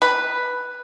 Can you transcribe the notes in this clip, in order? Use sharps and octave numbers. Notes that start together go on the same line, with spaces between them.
B4